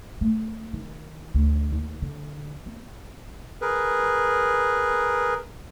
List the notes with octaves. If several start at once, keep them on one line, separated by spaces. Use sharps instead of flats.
A3
D#3
D2
D#2
D3
B3
G#4 A#4 B4